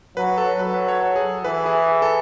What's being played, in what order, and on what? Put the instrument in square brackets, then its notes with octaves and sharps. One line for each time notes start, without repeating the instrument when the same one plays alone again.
[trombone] F#3 [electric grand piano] B4
[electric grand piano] A4
[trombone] F#3 [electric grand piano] B4
[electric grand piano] B4
C#5
A4
G#4
[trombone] E3 [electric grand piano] B4
[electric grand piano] G#4
A4